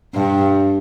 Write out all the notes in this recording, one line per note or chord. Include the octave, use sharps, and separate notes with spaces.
G2